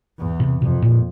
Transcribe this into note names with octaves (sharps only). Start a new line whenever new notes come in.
E2
C3
F2 C3
A#2